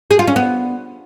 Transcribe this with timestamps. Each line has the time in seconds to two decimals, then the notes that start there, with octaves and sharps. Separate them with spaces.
0.11 G#4
0.19 F4
0.27 C#4
0.36 B3